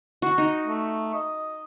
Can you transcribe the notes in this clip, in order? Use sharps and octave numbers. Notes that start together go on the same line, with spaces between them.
F#4
D#4
A3
D#5